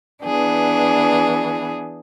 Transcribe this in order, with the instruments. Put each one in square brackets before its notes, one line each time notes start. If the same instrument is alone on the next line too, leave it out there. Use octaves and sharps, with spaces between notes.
[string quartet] E3 B3 D4 G#4